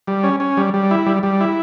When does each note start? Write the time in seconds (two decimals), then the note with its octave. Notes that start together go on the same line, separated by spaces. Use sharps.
0.07 G3
0.23 C#4
0.40 C#4
0.57 G3
0.74 G3
0.91 E4
1.06 G3
1.23 G3
1.41 E4